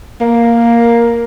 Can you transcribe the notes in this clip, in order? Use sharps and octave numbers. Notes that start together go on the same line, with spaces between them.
A#3